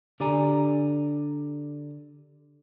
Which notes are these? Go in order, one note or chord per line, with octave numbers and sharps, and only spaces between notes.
D3 G4 D5 G#5 A#5